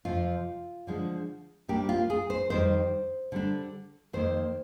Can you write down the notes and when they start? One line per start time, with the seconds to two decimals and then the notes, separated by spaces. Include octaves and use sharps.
0.05 F2 C3 F3 F4
0.87 D3 F3 G#3 D4
1.68 C3 G3 A#3 D4 G4
1.89 F4
2.10 G#4
2.30 C5
2.50 F2 D#3 G3 C5
3.32 D3 G3 D4
4.13 F2 D#3 A#3 C5